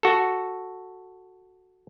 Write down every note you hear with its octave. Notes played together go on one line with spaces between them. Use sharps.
F#4 A4